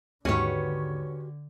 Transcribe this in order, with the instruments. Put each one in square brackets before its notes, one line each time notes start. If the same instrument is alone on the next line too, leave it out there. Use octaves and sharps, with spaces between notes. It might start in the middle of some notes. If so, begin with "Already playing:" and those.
[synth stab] D#2 G#2 [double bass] D3 [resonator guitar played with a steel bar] C#4 C#5 [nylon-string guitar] F#4 G4 B4